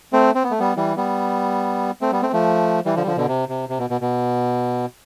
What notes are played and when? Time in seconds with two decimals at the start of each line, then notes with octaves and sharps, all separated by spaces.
0.13 A3 C4
0.35 C4
0.44 B3
0.51 A3
0.59 G3 B3
0.76 E3 G3
0.97 G3 B3
2.01 A3 C4
2.12 G3 B3
2.22 A3 C4
2.33 F3 A3
2.85 E3 G3
2.96 D3 F3
3.03 G3
3.06 D3 F3
3.17 B2 D3
3.28 C3
3.49 C3
3.69 C3
3.79 B2
3.90 B2
4.01 B2